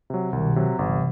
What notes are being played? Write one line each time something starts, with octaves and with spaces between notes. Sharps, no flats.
C3 F#3
C2 B2 D#3
C3 F#3
G1 C3 E3